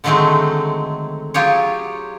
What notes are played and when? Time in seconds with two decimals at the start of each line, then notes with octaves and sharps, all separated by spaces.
0.04 D3 D#3 F#3 G#3 A3 C4
1.34 F#3 F4 G4 G#4 C#5